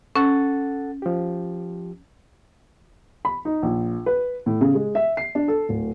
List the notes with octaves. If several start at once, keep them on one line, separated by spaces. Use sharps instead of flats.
C#4 A4 F#5 A6
F3 G4
B5
D#4
A#1
B4
A2
C#3
G#3
E5
C7
D4
A4
D1